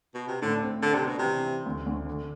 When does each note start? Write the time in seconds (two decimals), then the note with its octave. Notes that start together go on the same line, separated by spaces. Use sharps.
0.15 B2
0.28 C3
0.42 A2 D3
0.63 C4
0.82 D3 D4
0.95 C3
1.03 B2 D4
1.19 C3
1.24 E3
1.45 C4
1.66 D2
1.86 D2
2.07 D3